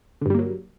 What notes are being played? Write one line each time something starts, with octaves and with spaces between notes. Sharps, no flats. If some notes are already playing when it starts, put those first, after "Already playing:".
G2 D3 F#3 G3 A#3